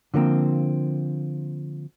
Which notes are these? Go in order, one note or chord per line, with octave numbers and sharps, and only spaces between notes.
D3 F3 A#3 C4